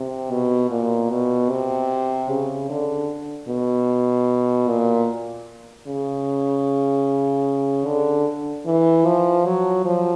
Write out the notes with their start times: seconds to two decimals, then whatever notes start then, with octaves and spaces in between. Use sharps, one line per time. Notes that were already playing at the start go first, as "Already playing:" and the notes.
Already playing: C3
0.31 B2
0.70 A#2
1.10 B2
1.50 C3
2.29 C#3
2.70 D3
3.48 B2
4.68 A#2
5.87 C#3
7.86 D3
8.66 E3
9.06 F3
9.45 F#3
9.85 F3